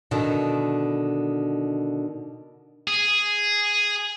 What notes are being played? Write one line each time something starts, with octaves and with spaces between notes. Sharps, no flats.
B2 D3 D#3
G#4